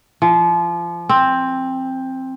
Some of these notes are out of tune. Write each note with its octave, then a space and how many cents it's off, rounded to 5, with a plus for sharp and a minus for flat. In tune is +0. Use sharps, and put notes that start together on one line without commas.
F3 -25
C4 +10